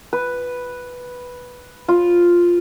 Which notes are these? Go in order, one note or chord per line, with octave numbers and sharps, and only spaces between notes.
B4
F4